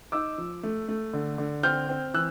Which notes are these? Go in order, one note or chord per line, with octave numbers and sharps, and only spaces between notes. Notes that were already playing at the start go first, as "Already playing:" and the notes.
D#4 D6 E6
F3
A3
A3
D3
D3
C4 F6 G6
C4
E3 E6 F#6